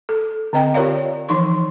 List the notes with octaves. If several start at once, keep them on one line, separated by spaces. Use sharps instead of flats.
A4
D3 C4 D#5 G5 A#5
F4 G4 A#4 C#5 D5 F5
E3 F3 D#4 C6 C#6